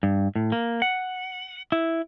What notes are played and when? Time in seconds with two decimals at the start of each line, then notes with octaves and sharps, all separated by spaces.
0.03 G2
0.36 A2
0.52 A#3
0.82 F#5
1.72 E4